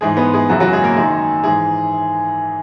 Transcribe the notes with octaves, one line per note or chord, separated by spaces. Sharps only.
G#2 E3 G#3 G#4
B3 B4
G#3 G#4
F#2 C#3 E3 F#3 F#4
F#3 F#4
G#3 G#4
A#3 A#4
F#2 D#3 G#3 G#4
G#2 E3 G#3 G#4